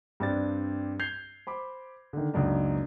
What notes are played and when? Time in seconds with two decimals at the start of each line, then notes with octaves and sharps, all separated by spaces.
0.20 G2 C4 D4 A6
1.00 G6 G#6 C7 F7 G7
1.47 C5 B5 D6
2.13 D3 D#3
2.33 C#2 F#2 A#3 D4 D#4